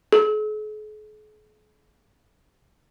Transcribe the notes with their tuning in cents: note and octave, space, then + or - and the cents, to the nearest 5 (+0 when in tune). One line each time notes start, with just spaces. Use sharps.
G#4 +45